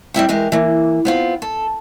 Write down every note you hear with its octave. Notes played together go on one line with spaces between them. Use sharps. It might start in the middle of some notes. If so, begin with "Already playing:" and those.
G3 C4 E4 G5
E3 G#3 G4 A#4
E3 A#3
B3 C4 F4
A4